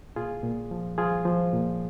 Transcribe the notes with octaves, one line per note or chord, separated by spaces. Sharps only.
A#2 F4 G#4
A#2
F3
F3 F4 G#4
F3
A#2